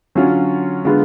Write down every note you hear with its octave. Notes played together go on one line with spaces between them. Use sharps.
D3 F#3 C#4 F4
D3 G#3 B3 F4